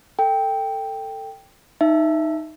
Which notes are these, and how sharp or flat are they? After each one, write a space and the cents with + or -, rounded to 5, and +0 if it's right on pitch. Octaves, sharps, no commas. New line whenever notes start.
A4 +20 G5 +5
D#4 +0 E5 +10 A5 -25